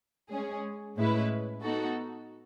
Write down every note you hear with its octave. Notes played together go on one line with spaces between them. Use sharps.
G#3 C#4 G#4
A2 G#3 C#4 E4 B4
B3 D#4 F#4 A4